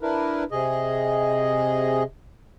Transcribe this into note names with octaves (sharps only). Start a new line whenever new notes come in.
D4 E4 A#4 B4
C3 G#4 D#5